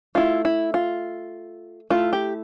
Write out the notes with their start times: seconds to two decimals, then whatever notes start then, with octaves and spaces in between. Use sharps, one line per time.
0.15 A3 E4 F4
0.45 E4
0.74 F4
1.90 A3 E4 F4
2.13 G4